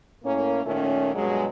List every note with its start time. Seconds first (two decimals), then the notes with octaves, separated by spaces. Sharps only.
0.24 A2 A#3 C#4
0.66 A#2 D#3 A3 C#4
1.15 G2 B2 F#3 G#3